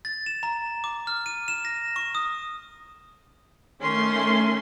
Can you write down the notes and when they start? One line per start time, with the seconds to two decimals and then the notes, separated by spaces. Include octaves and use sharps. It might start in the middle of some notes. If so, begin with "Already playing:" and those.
0.05 A6
0.26 E7
0.43 A#5
0.84 D6
1.07 F6
1.26 D#7
1.48 E7
1.65 A#6
1.96 C#6
2.15 D#6
3.81 D#3 A3 C#4 C6